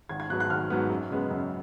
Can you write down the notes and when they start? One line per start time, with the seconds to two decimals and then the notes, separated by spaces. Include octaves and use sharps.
0.09 G#1 G#6
0.20 G#6
0.30 G#2 F#3 B3 F#6
0.40 F#6
0.50 G#1 F6
0.70 G#2 F#3 B3
0.90 F#2
1.10 C#3 G#3 B3
1.31 F#2